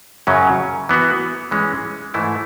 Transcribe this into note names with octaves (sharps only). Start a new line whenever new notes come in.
F#2 C#3 F#3 C#4
E3 B3 F#4
E3 G#3 C#4
G#2 E3 A3 E4